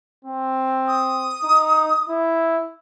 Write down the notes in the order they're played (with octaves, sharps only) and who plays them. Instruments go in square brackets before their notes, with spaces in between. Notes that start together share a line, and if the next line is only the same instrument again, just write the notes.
[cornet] C4
[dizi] D#6
[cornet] D#4
E4